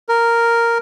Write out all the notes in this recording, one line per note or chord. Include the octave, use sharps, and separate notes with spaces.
A#4